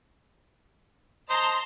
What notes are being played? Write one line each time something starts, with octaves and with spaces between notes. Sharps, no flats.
C5 D#5 A5 A#5 C6